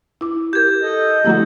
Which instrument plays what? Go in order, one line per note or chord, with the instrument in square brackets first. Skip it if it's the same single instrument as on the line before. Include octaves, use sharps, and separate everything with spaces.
[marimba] E4 D6
[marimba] G4 A#4 [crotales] G6 G#6
[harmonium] A4 D#5
[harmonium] D3 [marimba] F3 E4 A#5 [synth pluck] G3 A3 F#4